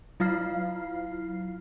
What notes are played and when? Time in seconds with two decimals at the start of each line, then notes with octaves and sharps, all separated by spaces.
0.20 F#3 E4 F4 F5 F6 C7